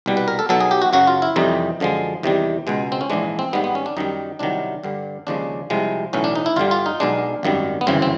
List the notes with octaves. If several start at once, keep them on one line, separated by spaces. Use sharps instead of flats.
C2 B2 G3
B4
A#4
A4
B1 B2 F#3 A4
G#4
G4
F#4
F#2 C#3 F#3 F#4
F4
E4
F2 C3 E3 G3 D#4
F#2 D3 F3 G#3
E2 C3 D#3 G3
C#2 B2 G#3
C4
C#4
A#1 G#2 E3 G#3 D4
C4
G#1 G#2 D#3 G3 B3
B3
C#4
D4
F#2 D#3 G3 D#4
C2 C3 D#3 F#3 D4
G2 D3 G3
D#2 C#3 F3 G#3 D4
C2 C3 F3 G#3
B1 A2 E3 C#4
D4
D#4
E4
G1 G2 D3 G3 F4
F4
D#4
B1 B2 G#3 D4
G#1 F#2 D#3 G3
B3
G1 F#2 C#3 E3 C4
C4